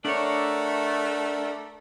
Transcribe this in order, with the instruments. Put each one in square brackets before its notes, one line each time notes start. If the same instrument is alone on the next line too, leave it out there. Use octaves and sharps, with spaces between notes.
[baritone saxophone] A3 [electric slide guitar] D4 C#5 [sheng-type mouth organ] A#4 D5 F#5